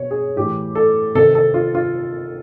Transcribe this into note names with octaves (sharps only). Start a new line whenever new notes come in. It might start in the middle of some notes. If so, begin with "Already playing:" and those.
Already playing: B2 C#5
G#4
A2 E3 G4
A4
C3 D#3 A4
A4
F4
F4